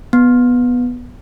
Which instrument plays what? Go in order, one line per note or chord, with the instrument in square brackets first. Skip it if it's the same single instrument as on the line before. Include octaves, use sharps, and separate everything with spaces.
[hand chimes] B3